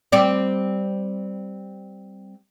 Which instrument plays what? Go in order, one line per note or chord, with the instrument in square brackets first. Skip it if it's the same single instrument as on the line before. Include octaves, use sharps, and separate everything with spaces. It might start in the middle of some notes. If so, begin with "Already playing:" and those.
[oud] G3 C4 D5